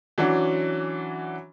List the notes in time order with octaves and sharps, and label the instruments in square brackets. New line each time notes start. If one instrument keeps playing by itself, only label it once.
[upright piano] E3 F#3 C#4 D4 F#4